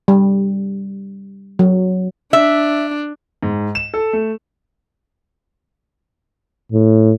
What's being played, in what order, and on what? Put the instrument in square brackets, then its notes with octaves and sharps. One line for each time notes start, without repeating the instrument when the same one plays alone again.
[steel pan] G3
F#3
[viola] D4 [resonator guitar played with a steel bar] E5
[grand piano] G#2
E7
A4
A3
[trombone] A2